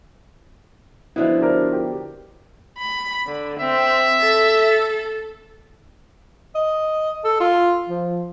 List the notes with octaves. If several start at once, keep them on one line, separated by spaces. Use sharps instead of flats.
B2 D3 F3 E4
D4 A#4 C5
G4
B5
D3
C4 E5
A4
D#5
A4
F4
F3